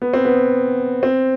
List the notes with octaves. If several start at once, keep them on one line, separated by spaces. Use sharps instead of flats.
B3
C4
B3
C4